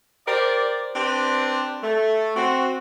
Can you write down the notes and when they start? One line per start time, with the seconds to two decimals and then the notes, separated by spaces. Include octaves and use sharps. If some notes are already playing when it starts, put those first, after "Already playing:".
0.26 G4 A#4 C5 D5
0.95 C4 D4 G4 B4 C5
1.82 A3
2.35 C4 F#4